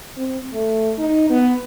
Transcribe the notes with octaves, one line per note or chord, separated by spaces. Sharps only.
C4
A3
D#4
B3